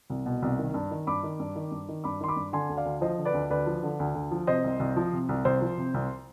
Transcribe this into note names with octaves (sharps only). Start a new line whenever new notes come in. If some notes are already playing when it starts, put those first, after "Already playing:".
C2
B2
C2
D#3
G2
D#3
G2 B5 D6
D#3
G2
D#3
G2
D#3
G2 B5 D6
D#3 C6
B5 D6
G2
D3 G#5 C6
D2
D5 F5
D2
F3 C5 D#5
D3
B4 D5
D2
D2 B4 D5
F3
D3
D2
D2
F3
C3 C5 D#5
C2
C2
F3
C3
C2
C2 C5
F3
C3
C2